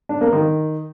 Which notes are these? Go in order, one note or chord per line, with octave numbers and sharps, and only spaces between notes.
D4
A#3
D#3